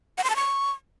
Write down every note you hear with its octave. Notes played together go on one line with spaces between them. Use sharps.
F#5
C6
A5
C#6